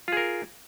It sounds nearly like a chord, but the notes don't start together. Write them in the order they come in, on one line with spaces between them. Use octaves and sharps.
F4 G#4 A#4